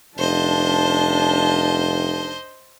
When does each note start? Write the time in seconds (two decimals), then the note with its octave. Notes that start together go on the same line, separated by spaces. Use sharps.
0.18 F1 D4 C5 D#5 A5